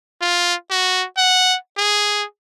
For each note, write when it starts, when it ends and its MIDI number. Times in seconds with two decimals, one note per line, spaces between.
0.21 0.54 65
0.71 1.05 66
1.17 1.56 78
1.78 2.24 68